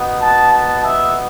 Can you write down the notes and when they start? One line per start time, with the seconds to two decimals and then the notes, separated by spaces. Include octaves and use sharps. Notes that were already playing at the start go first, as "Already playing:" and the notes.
Already playing: B3 D#4 F#4
0.22 A5
0.53 A5
0.85 E5